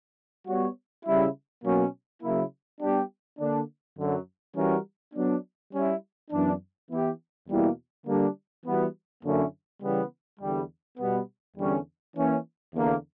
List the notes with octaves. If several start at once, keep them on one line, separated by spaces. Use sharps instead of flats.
G3 B3 F#4 C#5
C#3 G3 C#4 E4
B2 F#3 A#3 C#4
C#3 F#3 A#3 E4
G3 B3 D4 G4
D3 A#3 D4
F#2 D3 F#3
E3 G3 C#4 F#4 A#4
F#3 B3 D4
G3 C#4 E4
F#2 E3 B3 D4
E3 B3 E4 G4
E2 B2 G3 A#3 E4
D3 G3 A#3 D4
E3 G3 B3 F#4
F#2 D3 A#3 C#4 E4
C#3 E3 G3 B3
E2 D3 G3
B2 G3 B3
E2 D3 G3 C#4
E3 A#3 C#4
E2 D3 A#3